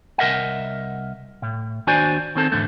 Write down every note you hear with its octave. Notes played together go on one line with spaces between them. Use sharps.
C2 A#4 D#5 E5 F#5
A2
D#2 D4 F#4 C5 D5 G#5
D#3 C4 A4
E2 G#2 D3 A3